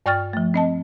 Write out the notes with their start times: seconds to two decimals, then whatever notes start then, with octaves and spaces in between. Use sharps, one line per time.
0.06 G2 D5 G5 C#6 F6 A6
0.33 F3 A3
0.54 C4 D#5 A5